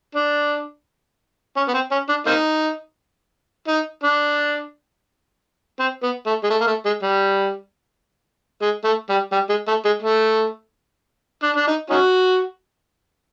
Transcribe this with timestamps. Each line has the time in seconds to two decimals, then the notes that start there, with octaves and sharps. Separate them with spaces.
0.15 D4
1.56 C#4
1.68 B3
1.74 C4
1.91 C#4
2.09 D4
2.26 A#3 C4 D#4
3.68 D#4
4.04 D4
5.80 C4
6.03 B3
6.26 A3
6.43 G#3
6.50 A3
6.61 A#3
6.67 A3
6.85 G#3
7.03 G3
8.62 G#3
8.84 A3
9.09 G3
9.32 G3
9.49 G#3
9.67 A3
9.85 G#3
10.02 A3
11.43 D4
11.56 D4
11.67 D#4
11.90 C#4 D#4 F#4